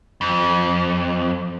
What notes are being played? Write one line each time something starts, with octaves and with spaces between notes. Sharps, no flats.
F2